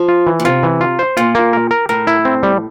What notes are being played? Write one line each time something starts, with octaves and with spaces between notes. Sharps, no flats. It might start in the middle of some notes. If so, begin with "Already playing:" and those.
Already playing: F3
F4
E3
A#2
C3 F4
E3
F4
C5
A#2 F4
A#3
A#4
A#4
A2 A#4
E4
C4
G3